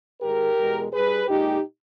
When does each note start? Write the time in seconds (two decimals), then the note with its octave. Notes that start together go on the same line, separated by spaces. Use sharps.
0.21 G#2 D#3 G#3 G4 A#4
0.57 E2 B2 G#3
0.92 G2 G3 G#4 B4
1.28 A#2 G#3 D#4 G4